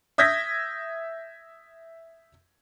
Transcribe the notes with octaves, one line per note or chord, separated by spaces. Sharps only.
E5 D#6 G6 G#6 A#6 B6